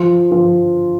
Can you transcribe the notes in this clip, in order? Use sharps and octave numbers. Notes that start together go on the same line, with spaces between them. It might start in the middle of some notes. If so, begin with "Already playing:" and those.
Already playing: F3
F3